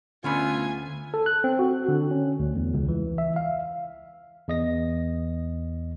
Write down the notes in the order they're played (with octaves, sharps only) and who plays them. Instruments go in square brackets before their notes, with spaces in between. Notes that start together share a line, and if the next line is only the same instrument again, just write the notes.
[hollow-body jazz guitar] D2 C#4 B5 [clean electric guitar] D3 A3 B3 [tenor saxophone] F4 [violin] G#5
[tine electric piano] A4
F#6
C4
F#4
D3
C#4
D2
E2
C#2
E3
E5
F5
E2 D#5 A#6